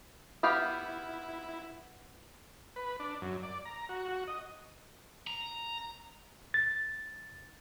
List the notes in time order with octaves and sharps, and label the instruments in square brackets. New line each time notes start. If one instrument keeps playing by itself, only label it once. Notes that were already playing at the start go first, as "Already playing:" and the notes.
[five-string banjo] B3 G4 F5 [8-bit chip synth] E4
[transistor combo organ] B4
D4
F#2
D5
A#5
F#4
F#4
D#5
[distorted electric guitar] A#5
[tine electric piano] A6